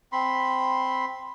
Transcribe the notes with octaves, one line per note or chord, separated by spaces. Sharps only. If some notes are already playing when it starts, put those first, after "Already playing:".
C4 B5 C6